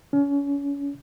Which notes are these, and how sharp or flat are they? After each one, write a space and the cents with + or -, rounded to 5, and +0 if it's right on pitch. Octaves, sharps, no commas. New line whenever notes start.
C#4 +30